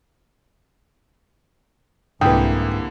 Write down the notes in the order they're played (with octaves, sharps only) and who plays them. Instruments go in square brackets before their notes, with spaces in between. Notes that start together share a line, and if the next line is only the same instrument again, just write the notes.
[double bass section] C2 [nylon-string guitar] G#2 B4 [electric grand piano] D3 A#3 E4 [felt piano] G5 D#6